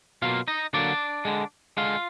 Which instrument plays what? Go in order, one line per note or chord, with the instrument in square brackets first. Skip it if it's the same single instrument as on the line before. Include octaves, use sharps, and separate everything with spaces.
[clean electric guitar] B2 F#3 A#3 F4 F5
D#4 D#5
D3 F#3 A#3 D4 D5
D3 G#3
D3 G#3 F4 F5